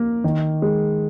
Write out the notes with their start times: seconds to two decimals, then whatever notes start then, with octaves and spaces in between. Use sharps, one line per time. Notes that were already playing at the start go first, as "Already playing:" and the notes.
Already playing: A#3
0.24 D#3
0.62 G#3